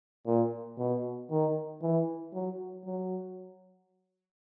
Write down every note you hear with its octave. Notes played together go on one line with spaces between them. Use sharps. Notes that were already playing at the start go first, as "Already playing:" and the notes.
A#2
B2
D#3
E3
F#3
F#3